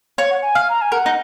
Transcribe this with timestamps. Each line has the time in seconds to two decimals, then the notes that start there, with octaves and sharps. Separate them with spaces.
0.18 C#5 F5
0.30 F#5
0.42 G#5
0.55 F5
0.70 A#5
0.81 G#5
0.92 A#4 F#5
1.06 D#4